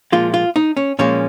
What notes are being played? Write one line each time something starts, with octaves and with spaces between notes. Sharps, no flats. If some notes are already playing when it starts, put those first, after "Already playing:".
A#2 F3 G#3 F4
F4
D#4
C#4
A#2 F3 G#3 C#4